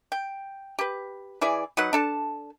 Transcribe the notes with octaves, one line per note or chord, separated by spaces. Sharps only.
G5
G4 B4
E3 E4 G#4 D5
F#3 D#4 B4 F#5
D4 A4 A5